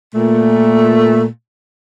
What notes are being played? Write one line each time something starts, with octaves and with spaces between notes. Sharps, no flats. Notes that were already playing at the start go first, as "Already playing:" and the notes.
A#2 A3